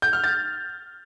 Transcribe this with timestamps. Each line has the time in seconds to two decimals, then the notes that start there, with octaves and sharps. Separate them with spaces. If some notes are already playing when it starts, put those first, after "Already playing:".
0.02 G6
0.13 F6
0.24 A6